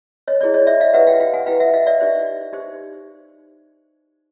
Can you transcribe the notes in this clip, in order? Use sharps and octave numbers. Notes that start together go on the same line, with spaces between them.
C#5 D#5
E4 G#4 C#5 D5
C#5 D#5
D5 E5
D#5 F5
E4 G4 B4 E5 F#5
F5 G5
F5 G5
F#5 G#5
E4 G4 B4 F5 G5
E5 F#5
D#5 F5
D5 E5
D#4 G4 C5
D#4 G4 C5